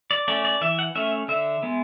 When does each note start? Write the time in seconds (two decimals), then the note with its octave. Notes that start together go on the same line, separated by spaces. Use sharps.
0.11 D5
0.28 A3 C#4 D5
0.45 D5
0.61 E3 E5
0.79 F#5
0.95 A3 C#4 E5
1.28 D3 E5
1.62 G#3 B3